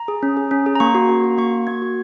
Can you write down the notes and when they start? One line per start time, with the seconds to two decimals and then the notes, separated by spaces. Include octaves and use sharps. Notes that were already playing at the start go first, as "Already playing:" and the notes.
Already playing: A#5
0.08 G#4
0.23 C#4
0.37 G#4
0.51 C#4
0.66 G#4
0.75 A#5
0.80 A#3 C#6
0.95 F#4
1.09 A#3
1.24 F#4
1.38 A#3 C#6
1.53 F#4
1.67 A#3 G#6
1.82 F#4